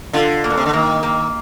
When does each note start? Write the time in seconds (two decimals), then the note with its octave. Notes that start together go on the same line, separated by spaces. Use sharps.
0.13 D3 F4
0.44 A#3
0.50 A#2
0.57 C3
0.66 D3
0.73 D#3 A#3
1.03 A#3